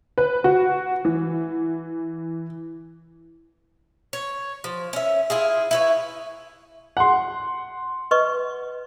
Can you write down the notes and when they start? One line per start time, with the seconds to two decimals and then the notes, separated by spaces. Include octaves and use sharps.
0.18 B4
0.44 F#4
1.05 E3
4.13 C#5
4.64 F3
4.93 C#4 E5
5.30 E4 F4 G#4
5.71 E4 B4 C#5
6.97 F#5 C6
8.11 B4 D#5 C#6